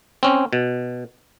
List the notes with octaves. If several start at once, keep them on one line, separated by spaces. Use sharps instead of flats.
C4 C#4
B2